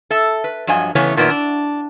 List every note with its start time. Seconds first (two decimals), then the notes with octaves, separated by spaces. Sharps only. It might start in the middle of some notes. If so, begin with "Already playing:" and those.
0.10 A4 E5
0.44 B4
0.67 G2 F3 F#3 D#5 G#5
0.95 C#3 E3 A3 B3 C#4 C#5
1.17 F#2 A#2 D#3 B3 D5 E5
1.29 D4